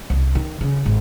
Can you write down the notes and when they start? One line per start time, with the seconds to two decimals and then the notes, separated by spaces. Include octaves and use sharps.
0.10 C2
0.35 D#3
0.61 C#3
0.86 G#1